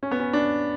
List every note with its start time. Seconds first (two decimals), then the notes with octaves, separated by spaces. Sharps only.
0.03 C#4
0.11 B3
0.20 C#4
0.33 D4